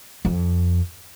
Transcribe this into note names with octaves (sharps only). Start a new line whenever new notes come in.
F2